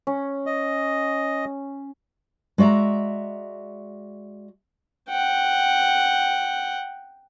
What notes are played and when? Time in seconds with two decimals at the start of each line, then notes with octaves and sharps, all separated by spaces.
0.07 C#4
0.46 D#5
2.58 G#3 F#4 D5 E5 A#5
5.10 F#5 G5